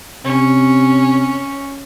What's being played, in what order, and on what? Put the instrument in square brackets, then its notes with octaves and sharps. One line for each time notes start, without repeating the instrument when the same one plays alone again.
[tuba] C3 [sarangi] C#4